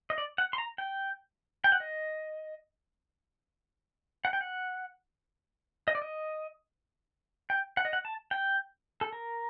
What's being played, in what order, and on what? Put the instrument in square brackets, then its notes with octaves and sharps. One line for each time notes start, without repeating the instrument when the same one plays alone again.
[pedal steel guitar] D#5
D5
F#5
C6
A#5
G5
G5
F#5
D#5
F#5
G5
F#5
D#5
D5
D#5
G5
F#5
D#5
F#5
A5
G5
A4
A#4